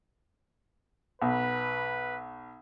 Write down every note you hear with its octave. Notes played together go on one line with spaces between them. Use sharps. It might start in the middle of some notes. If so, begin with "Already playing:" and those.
B1 B4